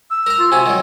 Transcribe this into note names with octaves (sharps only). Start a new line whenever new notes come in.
E6
A#4 A#5
F4
C3 F#4 G#5
D#3 F#3